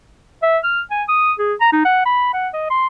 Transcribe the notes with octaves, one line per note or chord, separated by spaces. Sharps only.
E5
F6
G#5
D#6
G#4
A#5
D#4
F#5
B5
F#5
D#5
C6